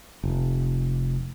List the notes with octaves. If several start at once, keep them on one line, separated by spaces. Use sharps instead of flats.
F1